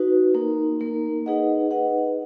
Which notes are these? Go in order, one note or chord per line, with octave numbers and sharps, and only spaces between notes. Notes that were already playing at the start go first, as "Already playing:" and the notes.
Already playing: D#4 F#4 B4
A#3 D#4 A#4
A#3 D#4 A#4
D#4 G#4 B4 D#5 F#5
D#4 G#4 B4 D#5 F#5